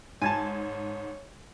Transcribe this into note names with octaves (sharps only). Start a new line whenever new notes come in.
G#2 C#5 G#5 A5 G#6